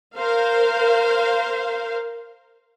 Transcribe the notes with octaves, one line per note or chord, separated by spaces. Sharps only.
A#4 C5 F5